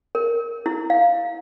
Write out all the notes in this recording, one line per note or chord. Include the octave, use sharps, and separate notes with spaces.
A#4
E4
F5